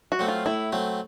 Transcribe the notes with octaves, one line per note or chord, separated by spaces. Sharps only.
F#4
F#3 A3 C4
F4
A2 E4
F#3 A3 C4